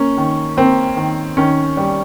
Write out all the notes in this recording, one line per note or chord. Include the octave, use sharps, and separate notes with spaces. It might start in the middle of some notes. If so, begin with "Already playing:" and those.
Already playing: A#3 C#4
D#3
A#3 C4
D#3
D#3 C#4
G3